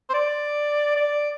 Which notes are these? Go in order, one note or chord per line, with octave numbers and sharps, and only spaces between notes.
C5
D5
D5